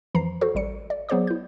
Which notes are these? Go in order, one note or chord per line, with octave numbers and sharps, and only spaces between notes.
F2 E3 F3 A#5 C7
F#4 A4 C5
A1 G3 C#7
D5
F#3 B3 G#4 C5 D5 D6
E4 G6